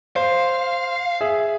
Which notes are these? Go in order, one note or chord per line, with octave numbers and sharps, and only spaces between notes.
C5 F5
G#4 E5